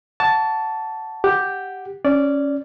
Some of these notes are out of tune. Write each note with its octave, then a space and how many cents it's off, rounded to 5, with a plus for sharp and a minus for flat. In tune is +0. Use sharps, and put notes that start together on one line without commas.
F#5 +0 A5 +0 C#6 +40
G4 +0 F#5 +0
C#4 +0 D5 -10